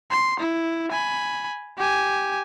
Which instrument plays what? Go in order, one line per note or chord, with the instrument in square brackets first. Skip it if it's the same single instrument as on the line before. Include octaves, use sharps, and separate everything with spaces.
[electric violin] C6
E4
G#5 B5
G4 G#5